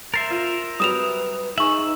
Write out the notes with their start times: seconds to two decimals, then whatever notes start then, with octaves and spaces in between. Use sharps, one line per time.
0.14 A#4 C5 E5 A6 C7
0.30 F4
0.80 F#3 G3 B4 D#6 E7 F7
1.58 D#4 G#4 E5 C#6 E6 F#7